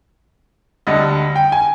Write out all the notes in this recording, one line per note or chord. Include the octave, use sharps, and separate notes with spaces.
D2 D3 G3 D#5
G5
G#5